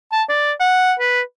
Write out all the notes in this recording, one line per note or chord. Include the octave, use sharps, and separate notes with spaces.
A5
D5
F#5
B4